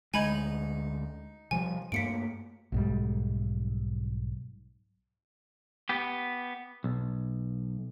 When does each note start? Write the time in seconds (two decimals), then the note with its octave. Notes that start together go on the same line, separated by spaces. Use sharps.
0.14 D2 G#3 D#4 G#5 B5 G#6
1.51 C3 F3 G3 G#5
1.92 G2 A3 A#3 B6 C#7 D7
2.72 B1 G#2 G3
5.89 B3 G4
6.84 B1